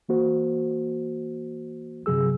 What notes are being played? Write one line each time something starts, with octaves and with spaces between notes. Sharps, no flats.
E3 A#3 F#4 C5
G2 C3 F#3 G#4 E6